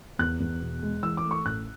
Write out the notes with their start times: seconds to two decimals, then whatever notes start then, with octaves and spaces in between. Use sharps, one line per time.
0.19 E2 F#6
0.40 E2
0.61 B2
0.82 G#3
1.03 E3 E6
1.17 D6
1.24 A3
1.31 C#6
1.45 A1 F#6